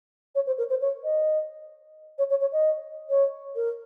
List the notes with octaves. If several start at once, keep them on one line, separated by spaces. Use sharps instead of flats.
C#5
C5
A#4
C5
C#5
D#5
C#5
C#5
C#5
D#5
C#5
A#4